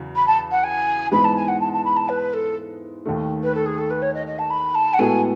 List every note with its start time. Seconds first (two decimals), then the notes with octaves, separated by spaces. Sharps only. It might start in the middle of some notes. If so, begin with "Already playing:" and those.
Already playing: E2 C#3 F#3
0.15 B5
0.27 A5
0.51 F#5
0.63 G#5
1.11 G#2 E3 G#3 B3 B5
1.24 A5
1.36 G#5
1.48 F#5
1.60 A5
1.73 A5
1.84 B5
1.96 A5
2.09 B4
2.33 A4
3.05 D#2 D#3 A3
3.43 B4
3.54 A4
3.65 G#4
3.78 A4
3.90 B4
4.02 C#5
4.14 D#5
4.26 D#5
4.38 A5
4.50 B5
4.75 A5
4.93 F#5
4.99 A2 G#3 B3 F#4 A4 G#5